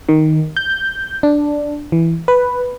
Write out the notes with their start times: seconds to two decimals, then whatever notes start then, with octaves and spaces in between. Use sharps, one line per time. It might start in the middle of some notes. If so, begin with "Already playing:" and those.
0.09 D#3
0.57 G6
1.23 D4
1.92 E3
2.28 B4